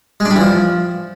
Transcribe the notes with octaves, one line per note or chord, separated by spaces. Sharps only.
G#3
D4
G3
E3
F3